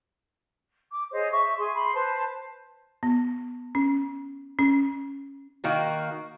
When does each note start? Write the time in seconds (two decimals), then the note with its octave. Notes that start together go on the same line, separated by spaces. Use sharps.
0.92 D6
1.12 G#4 C5 C#5 D#5
1.33 E5 C#6
1.57 G#4 C6
1.75 B5 C6
1.94 B4 C5 A5
3.03 B3
3.75 C#4
4.59 C#4
5.64 D#3 A#3 F#4